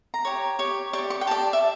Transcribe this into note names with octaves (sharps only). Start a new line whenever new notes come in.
A#5
G4 C#5
G4 C#5
G4 D5 C#6
C#6
G5
G4 D5 A5
E5